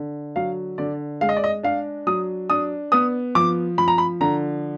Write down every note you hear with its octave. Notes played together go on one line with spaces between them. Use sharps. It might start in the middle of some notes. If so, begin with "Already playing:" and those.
Already playing: D3
F#3 F5
D3 D5
G#3 F5
D#5
D5
D#5
D4 F5
F#3 D#6
D4 D#6
B3 D#6
F3 D6
F3 B5
A#5
B5
D3 A#5